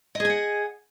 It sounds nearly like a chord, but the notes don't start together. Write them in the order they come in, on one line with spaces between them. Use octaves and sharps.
D#5 G#4 G#5 F#5